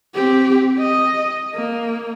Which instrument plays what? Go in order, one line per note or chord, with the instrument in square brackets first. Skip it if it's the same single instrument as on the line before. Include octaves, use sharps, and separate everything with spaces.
[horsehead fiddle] C4 G4
D#5
A#3